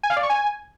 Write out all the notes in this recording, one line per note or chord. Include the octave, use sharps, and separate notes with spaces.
G#5
F5
D5
C#6
G#5